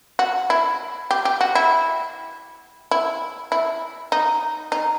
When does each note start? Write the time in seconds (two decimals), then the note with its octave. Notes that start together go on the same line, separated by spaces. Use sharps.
0.19 F#4
0.50 E4
1.11 G4
1.25 G4
1.41 F#4
1.55 E4
2.91 E4
3.52 E4
4.12 D#4
4.72 D#4